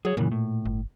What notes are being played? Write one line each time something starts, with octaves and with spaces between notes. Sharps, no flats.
F#3 G#4 C#5
F#2 A#2 C#3 E3
A2
G1